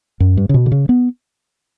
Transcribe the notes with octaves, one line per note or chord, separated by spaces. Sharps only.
F#2
G2
C#3
B2
D3
C#3
B3